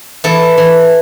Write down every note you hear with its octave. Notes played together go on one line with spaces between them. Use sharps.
E3 A4
E3